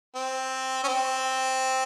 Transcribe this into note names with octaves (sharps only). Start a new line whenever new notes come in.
C4
C#4
C4